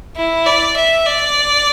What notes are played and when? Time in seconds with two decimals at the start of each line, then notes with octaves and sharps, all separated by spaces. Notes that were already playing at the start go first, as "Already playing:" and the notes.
0.16 E4
0.46 D5
0.76 E5
1.06 D5